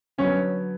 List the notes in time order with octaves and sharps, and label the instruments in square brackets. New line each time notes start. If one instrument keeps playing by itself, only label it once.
[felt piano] D3 F#3 B3 [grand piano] C#4